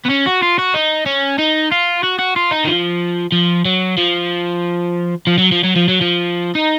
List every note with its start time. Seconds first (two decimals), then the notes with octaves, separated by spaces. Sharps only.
0.05 B3
0.09 C#4
0.26 F#4
0.42 F4
0.59 F#4
0.74 D#4
1.06 C#4
1.38 D#4
1.72 F4
2.04 F#4
2.19 F#4
2.36 F4
2.51 D#4
2.64 D#3
2.67 F3
3.32 F3
3.65 F#3
3.98 F3
5.27 F3
5.38 F#3
5.52 F3
5.64 F#3
5.76 F3
5.88 F#3
6.01 F3
6.55 D#4